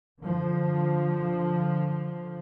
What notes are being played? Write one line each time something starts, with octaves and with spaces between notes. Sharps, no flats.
D3 F3